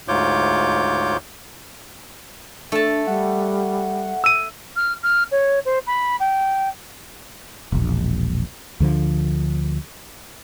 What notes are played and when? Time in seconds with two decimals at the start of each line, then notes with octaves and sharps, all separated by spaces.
0.08 D2 G#2 F4 C#5 D6 G6
2.72 A3 D4 A5
3.07 G3 F#5
4.24 E6 D#7
4.76 F6
5.03 F6
5.31 C#5
5.65 C5
5.87 B5
6.20 G5
7.72 E1 A#1
8.80 D2 D3 F3